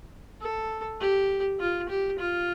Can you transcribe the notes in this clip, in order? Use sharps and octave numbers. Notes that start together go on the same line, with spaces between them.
A4
G4
F4
G4
F4